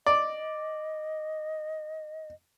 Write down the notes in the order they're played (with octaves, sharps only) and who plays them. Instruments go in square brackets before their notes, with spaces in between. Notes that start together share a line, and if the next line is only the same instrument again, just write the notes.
[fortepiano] D5 [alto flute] D#5